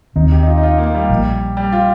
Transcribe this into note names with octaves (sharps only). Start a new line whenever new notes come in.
D#2 D#3 C4 D#4
G4
D#4
F4
D#4
F4
A#3
G3
A#1 A#2 A#3
G3
F4